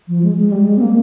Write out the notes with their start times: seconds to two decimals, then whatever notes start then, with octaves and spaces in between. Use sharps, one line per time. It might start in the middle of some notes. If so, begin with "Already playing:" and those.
0.08 F3
0.23 G#3
0.37 G#3
0.52 G3
0.66 G#3
0.77 C4
0.81 A#3